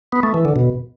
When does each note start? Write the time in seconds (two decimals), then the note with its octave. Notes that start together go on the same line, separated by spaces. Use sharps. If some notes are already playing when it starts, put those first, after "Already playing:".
0.12 B3
0.23 A3
0.34 E3
0.45 D3
0.56 B2